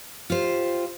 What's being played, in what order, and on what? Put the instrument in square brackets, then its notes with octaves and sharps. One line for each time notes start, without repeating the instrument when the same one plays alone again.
[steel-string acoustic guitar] F4 G4 C5